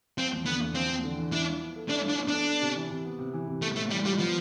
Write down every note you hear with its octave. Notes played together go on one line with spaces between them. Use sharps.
F3 C4
E2
D3 B3
E2
F3 C4
E2
D3
E2
D4 E4
F3
B3
A4
D4 E4
F3
D4
B3
D4 A4
B3
C3
E3
C3
B3
C3
E3
C3
A3 B3
A2 A3
E3 G3
G3 F4
F3 B3